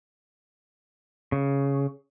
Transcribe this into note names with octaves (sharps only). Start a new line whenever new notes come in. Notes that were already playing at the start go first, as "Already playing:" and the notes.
C#3